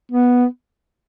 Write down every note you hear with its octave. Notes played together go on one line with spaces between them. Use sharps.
B3